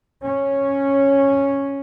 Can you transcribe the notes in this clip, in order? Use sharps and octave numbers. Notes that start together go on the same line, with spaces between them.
C#4